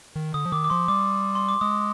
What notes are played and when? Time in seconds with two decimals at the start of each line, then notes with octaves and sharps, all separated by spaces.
0.16 D#3
0.34 D3 D#6
0.46 F3
0.52 D#3 D6
0.64 D6
0.70 F3 C6
0.88 G3 D6
1.35 C6
1.49 D6
1.61 G#3 D#6